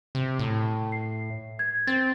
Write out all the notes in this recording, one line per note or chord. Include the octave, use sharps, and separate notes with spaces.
C3
A2
C7
G#6
C4 A6